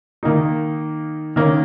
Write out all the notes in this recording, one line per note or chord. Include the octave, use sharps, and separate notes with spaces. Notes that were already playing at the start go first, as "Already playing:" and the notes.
D#3 A#3 D#4
D#3 A#3 C#4